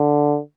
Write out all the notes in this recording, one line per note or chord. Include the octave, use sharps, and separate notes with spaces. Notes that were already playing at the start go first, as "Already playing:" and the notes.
Already playing: D3